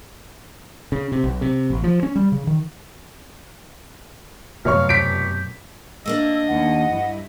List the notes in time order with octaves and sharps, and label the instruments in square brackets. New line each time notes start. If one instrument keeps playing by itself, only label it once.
[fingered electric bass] C#3
C3
B1
C3
A1
F3
C#4
G3
C#3
D#3
[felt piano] F1 C#5 C#6 [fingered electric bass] F#2 B2 [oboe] F5
[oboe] G4 [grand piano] B6 D7
[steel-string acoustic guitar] A3 A#3 D4 [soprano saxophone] D#5 [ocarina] E6
[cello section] D#2 [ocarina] F#5
[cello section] G2 E4